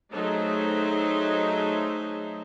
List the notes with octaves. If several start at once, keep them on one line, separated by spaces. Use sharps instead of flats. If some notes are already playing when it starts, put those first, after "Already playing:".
F#3 A3 D#4 G#4 C5 E5